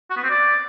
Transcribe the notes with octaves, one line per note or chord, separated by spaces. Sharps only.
F#4
B3
C4
D5